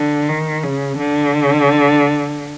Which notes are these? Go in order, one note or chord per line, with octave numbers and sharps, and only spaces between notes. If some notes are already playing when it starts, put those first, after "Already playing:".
Already playing: D3
D#3
C#3
D3